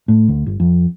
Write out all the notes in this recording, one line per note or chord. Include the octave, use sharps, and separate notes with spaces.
A2
D2
G1
F2